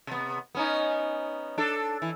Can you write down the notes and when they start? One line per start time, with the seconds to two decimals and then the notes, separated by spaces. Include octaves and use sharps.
0.07 C3 B3
0.55 B3 C#4 D#4
1.58 D4 A4
2.02 E3